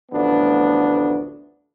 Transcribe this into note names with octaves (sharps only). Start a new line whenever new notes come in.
A1 D2 F3 B3 D4